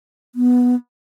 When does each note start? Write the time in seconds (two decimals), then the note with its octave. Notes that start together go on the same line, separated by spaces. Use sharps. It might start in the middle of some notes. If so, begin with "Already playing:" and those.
0.35 B3